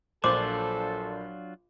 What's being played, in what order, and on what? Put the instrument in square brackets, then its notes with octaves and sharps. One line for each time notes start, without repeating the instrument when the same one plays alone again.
[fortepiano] A#1 C5 [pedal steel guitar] F#3 D4 F4 [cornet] A4 [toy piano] D6